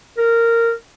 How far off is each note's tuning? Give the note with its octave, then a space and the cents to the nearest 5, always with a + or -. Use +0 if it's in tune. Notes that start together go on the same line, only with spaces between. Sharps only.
A#4 -15